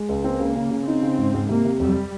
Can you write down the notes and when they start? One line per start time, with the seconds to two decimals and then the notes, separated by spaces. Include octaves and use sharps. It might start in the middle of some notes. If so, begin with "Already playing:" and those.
Already playing: G#3
0.09 C#2
0.24 A#3 C4
0.40 C#3
0.55 C#3
0.71 C#3
0.86 C4 D#4
1.03 C#3
1.18 G#2
1.34 G#2
1.49 C3 A#3
1.65 C3
1.80 F2 G3